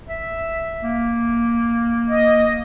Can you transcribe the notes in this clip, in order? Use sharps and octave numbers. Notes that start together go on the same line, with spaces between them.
E5
A#3
D#5